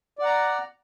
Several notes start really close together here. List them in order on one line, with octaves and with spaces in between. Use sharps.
D5 F#5 A#5